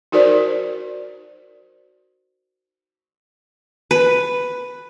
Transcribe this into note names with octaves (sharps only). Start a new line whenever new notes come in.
D#4 F#4 A#4 C5 D5
B4